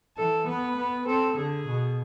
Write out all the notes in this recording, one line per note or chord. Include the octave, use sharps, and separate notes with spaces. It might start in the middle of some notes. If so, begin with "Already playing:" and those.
E3 A4
B3 B4
B3
C4 A4
D3 G#4
B2